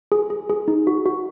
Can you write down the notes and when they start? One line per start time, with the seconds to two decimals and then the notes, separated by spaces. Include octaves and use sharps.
0.12 G#4
0.30 G#4
0.49 G#4
0.68 D#4
0.87 F#4
1.06 F#4